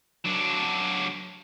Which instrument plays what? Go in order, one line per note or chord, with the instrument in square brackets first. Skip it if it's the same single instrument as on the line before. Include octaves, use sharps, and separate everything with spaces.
[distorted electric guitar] F#3 D4